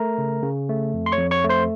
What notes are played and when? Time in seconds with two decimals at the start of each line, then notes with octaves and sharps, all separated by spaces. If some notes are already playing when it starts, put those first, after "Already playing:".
Already playing: A3 A#4 A#5
0.18 C#3
0.43 C#3
0.69 A3
0.94 F2
1.06 C6
1.12 C#5 C#6
1.18 F2
1.31 C#5 C#6
1.44 A3
1.49 C5 C6